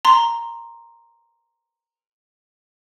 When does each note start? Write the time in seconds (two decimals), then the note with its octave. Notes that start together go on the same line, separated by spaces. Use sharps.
0.05 A#5 C6